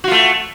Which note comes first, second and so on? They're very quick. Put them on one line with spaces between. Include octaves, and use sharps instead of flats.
F#4 F4 A3